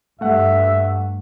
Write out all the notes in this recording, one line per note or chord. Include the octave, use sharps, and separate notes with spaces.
G2 A3 E5 F#5